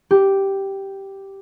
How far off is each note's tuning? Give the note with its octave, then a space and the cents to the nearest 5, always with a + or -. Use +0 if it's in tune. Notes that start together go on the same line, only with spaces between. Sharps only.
G4 -5